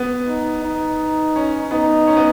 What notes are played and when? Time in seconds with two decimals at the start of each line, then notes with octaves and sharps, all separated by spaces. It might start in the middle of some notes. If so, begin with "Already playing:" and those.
Already playing: B3
0.27 D#4
0.64 D#4
1.36 C#4
1.71 B3 D#4
2.07 C#4
2.17 B3